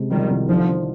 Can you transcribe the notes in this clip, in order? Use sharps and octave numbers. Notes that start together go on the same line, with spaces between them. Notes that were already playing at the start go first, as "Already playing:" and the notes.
Already playing: C3 G#3
D#3 F3 G3
C2
D3 F3 D#4
D#3